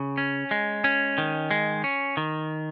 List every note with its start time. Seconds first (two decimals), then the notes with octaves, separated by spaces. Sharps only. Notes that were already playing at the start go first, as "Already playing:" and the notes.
Already playing: C#3
0.18 C#4
0.51 G#3
0.84 C#4
1.18 D#3
1.51 G#3
1.84 C#4
2.17 D#3